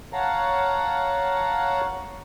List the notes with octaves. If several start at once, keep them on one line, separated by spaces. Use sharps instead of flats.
C#5 F5 F#5 A5 A#5